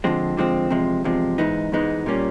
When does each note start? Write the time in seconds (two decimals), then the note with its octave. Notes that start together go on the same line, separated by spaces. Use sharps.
0.04 D3 F3 G#3 C4
0.37 D3 F3 G#3 C4
0.70 E2 C3 F3 G#3
1.04 E2 C3 F3 G#3
1.38 G#2 E3 G#3 B3 D#4
1.72 G#2 E3 G#3 B3 D#4
2.06 A#2 G3 A#3 C#4